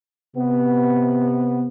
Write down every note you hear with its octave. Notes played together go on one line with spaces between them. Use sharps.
C3 B3